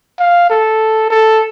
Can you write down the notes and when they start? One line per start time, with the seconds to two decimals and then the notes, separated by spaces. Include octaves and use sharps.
0.20 F5
0.50 A4
1.11 A4